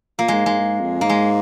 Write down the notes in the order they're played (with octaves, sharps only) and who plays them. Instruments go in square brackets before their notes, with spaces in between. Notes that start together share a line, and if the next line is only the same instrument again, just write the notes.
[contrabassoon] A#2 [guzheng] A#3
[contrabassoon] G#2 [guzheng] G#3
[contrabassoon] G#2 [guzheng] G#3
[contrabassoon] G#2
F2
[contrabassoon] G#2 [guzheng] A#3
[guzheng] G#3